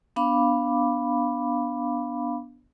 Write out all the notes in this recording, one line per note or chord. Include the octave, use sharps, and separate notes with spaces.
B3 D4 F5 B5 D6